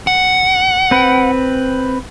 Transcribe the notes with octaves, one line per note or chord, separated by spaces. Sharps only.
F#5
C4 B4